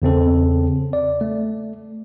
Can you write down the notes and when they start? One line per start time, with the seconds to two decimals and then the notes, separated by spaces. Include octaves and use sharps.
0.02 E2 C#3 C4 A4
0.93 D5
1.21 A3